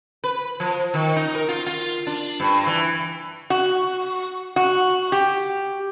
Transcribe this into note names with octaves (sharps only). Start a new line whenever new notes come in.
B4
F3
D#3
D#4
A#4
F4
F4
D4
G2
E3
F#4
F#4
G4